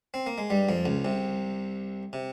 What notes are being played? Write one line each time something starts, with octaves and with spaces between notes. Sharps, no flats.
C4
A#3
G#3
G2 G3
F2 F3
C#2 C#3
C2 C3
C3